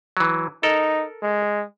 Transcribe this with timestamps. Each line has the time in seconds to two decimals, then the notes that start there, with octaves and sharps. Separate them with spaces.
0.17 E3 F#3
0.63 D#4 A4 A#4
1.22 G#3